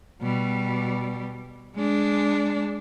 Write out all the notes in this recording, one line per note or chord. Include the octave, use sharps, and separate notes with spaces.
B2 G3
G#3 D4